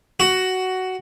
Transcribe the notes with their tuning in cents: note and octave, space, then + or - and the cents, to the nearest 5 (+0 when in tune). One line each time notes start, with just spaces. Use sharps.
F#4 +10